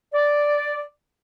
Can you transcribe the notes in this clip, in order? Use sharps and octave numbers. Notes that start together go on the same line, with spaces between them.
D5